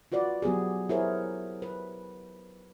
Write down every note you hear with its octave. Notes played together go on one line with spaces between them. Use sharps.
F4 F#4 B4 D5
F#3 B3 G4 G#4
E4 G#4 A#4 C5 C#5
B4